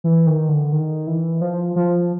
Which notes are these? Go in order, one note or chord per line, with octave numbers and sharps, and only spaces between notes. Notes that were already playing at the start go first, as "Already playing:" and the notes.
E3
D#3
D3
D#3
E3
F3
F3